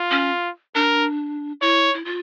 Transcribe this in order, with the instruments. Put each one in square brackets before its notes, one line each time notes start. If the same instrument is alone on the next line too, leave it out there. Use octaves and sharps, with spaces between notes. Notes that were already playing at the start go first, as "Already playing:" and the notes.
Already playing: [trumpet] F4
[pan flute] C#4
[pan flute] D4 [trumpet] A#4
[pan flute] E4 [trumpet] C#5
[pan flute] E4
F4